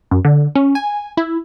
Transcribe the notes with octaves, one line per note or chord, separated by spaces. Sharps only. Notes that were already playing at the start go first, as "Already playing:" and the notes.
F#2
D3
C#4
G#5
E4